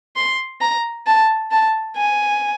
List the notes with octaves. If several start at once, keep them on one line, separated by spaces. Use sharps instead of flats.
C6
A#5
A5
A5
G#5